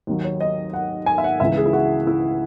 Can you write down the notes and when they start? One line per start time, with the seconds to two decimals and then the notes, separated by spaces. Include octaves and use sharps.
0.07 D#2 D#3 F#3
0.24 C#5
0.41 D#5
0.74 F#5
1.06 G#5
1.18 E5
1.24 F#5
1.40 C#2 C#3 E3 E5
1.57 G#4
1.66 E4
1.73 F#4
2.07 E4